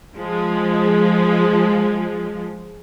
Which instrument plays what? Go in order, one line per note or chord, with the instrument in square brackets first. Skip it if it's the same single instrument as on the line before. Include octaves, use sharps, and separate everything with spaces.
[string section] F3 G#3